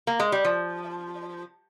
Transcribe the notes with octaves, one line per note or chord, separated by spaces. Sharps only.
A#3
G#3
G3
F3